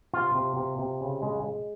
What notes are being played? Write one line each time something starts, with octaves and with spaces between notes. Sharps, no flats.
C3 F4
C3
C3
C3
C#3
G#3
G#3